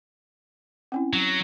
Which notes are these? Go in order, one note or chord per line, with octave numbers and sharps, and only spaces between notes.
C4 C#4 E4
F#3